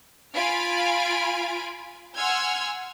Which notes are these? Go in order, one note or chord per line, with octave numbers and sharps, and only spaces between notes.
F4 F5 G#5 B5 D7
F#5 G#5 C6 E6 F6 G#6